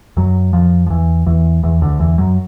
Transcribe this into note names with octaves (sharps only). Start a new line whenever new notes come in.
F#2 F#3
F2 F3
F3
E2 E3
E2 E3
E2 E3
D2 D3
E2 E3
F#2 F#3